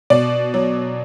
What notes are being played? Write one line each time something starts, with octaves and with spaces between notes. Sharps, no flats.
B2 D5
F#3